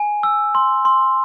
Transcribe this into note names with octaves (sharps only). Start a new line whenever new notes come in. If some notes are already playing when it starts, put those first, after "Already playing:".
Already playing: G#5
E6
C6
C6